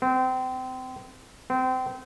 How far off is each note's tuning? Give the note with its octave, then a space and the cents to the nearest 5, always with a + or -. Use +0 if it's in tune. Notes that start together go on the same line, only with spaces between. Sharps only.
C4 -30
C4 -30